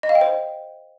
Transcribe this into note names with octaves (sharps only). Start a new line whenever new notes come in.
D#5
F5
G5
C5